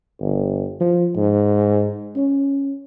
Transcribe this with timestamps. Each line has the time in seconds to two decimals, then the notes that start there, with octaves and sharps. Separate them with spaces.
0.21 G1
0.80 F3
1.16 G#2
2.16 C#4